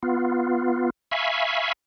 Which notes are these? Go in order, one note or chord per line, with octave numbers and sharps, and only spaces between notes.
B3 F4
E5 F5 G#5 B5 C#6